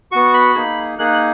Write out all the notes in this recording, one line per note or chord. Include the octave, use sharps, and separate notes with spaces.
B3 F#4 C#6
B5
A#3 D#4 G#4
A#3 D#4 G#4 F#6